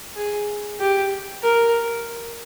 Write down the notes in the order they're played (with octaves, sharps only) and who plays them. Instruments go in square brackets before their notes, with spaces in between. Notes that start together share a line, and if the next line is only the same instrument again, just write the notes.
[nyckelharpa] G#4
G4
A#4